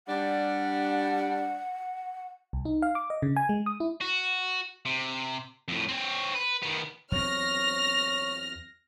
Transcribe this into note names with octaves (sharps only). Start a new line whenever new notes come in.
G3 D4 F#5
C2
D#4
F5
D6
D#5
C#3
G#5
G#3
D#6
E4
F#4
C3
F2 A2
C4 C#5
B4
D#3 B3
E2 F#3 C4 C#5 F6 A#6